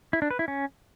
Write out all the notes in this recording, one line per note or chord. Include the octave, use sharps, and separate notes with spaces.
E4
D4
B4
E4
C#4